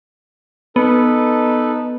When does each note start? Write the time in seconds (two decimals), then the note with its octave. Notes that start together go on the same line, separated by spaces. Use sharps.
0.76 B3 D#4 A4 B4